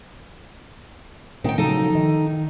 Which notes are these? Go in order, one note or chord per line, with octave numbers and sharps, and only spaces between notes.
A#2 D#3 C4 G5
C#3 F3 F#3 D#4 A4
D#3